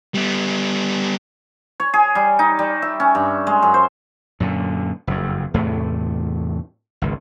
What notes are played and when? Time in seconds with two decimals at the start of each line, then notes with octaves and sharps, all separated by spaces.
0.15 G3 B3
1.80 C#5
1.94 G#4
2.15 G3
2.39 D#4
2.59 G3
2.82 E5
3.00 C#4
3.15 G2
3.47 G#3
3.63 F#2
3.74 C5
4.40 F#2 A#2 D3
5.07 F#1 F2
5.54 E2 A2 C3 A3
7.02 G#1 C#2